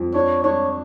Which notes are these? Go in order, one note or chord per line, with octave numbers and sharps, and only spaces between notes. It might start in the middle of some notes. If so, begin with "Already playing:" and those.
Already playing: F2
D4 C#5
D4 C#5